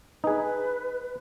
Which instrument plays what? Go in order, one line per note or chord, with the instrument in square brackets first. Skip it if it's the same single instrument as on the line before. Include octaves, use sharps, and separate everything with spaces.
[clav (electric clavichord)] D#4 G#4 [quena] B4